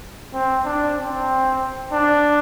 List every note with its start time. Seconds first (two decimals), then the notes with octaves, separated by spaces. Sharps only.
0.33 C4
0.65 D4
0.97 C4
1.93 D4